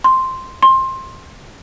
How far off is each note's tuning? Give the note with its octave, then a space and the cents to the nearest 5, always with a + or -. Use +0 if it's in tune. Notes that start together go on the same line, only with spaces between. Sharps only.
C6 +0
C6 +20